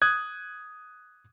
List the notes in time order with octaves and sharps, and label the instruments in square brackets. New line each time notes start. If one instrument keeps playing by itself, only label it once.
[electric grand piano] D#6 F#6 G#6